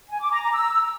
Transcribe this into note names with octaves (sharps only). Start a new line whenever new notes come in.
G#5
D6
A#5
A#5
E6